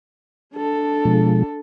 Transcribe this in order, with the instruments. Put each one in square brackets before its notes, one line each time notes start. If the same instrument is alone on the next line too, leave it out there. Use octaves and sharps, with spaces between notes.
[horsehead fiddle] D4 A4
[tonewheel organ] B2 F3 G#3